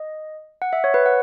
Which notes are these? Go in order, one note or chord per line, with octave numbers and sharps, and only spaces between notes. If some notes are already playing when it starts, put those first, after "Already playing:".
Already playing: D#5
F#5
E5
C#5
B4
F#5